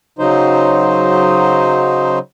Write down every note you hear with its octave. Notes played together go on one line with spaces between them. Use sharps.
C#3 F#3 D#4 C5